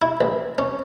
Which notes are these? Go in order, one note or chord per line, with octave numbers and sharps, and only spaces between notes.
E4
A1
C#4